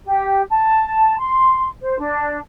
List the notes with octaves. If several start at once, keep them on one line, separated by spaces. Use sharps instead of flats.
G4
A5
C6
C5
D4